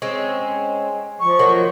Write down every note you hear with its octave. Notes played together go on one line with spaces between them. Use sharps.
G#3 C4 C#4
F3 C#6
D#3 F#3 A#3